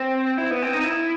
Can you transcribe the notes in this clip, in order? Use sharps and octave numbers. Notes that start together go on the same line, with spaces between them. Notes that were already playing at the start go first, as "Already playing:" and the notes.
Already playing: C4
E4
B3
C4
D#4
E4